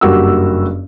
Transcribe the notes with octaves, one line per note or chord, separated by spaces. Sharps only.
F#1 G2 A#3 F#4 G4 E6